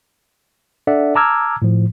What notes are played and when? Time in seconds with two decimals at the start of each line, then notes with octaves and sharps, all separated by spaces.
0.87 D4 A4 D5 E5 F#5
1.15 A5 A#5 D6 E6 F6 G#6
1.62 A2 F3